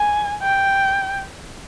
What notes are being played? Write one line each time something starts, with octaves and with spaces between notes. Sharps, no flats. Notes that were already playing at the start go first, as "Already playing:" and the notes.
Already playing: G#5
G5